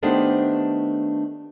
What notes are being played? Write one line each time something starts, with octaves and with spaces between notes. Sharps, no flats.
D#3 A3 B3 D4 G4 C5